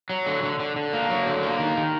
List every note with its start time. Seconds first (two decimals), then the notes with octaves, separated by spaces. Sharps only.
0.10 F#3
0.26 D3
0.43 D3
0.59 D3
0.76 D3
0.93 A#3
1.10 F#3
1.26 D3
1.43 A#3
1.60 D#3
1.77 D#3